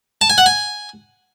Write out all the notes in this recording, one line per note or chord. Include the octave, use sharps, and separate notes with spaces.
A5
G#5
F#5
G#5